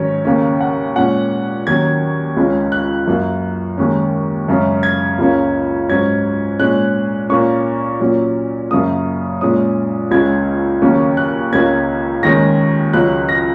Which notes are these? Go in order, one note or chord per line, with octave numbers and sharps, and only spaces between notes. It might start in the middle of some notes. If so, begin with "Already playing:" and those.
Already playing: G#2 D#3 F#3 C#4 C#5
D#2 C#3 A#3 C#4
F#5
A#2 G#3 C#4 F#5
D#2 D#3 F#3 C#4 G#6
C#2 C#3 G#3 C#4
F#6
F#2 F#3 A#3
D#2 D#3 G#3 C#4
F#2 C#3 G#3 C#4
G#6
C#2 C#3 A#3 C#4
G#2 F#3 C#4 G#6
A#2 G#3 C#4 F#6
A#2 A#3 C#4 C#6
A#2 F#3 C#4
F#2 C#3 A#3 C#4 D#6
A#2 G#3 C#4 D#6
C#2 C#3 G#3 C#4 G#6
D#2 C#3 F#3 A#3 C#4
F#6
C#2 C#3 A#3 C#4 G#6
D#2 D#3 G#3 C#4 A#6
C#2 C#3 F#3 F#6
A#6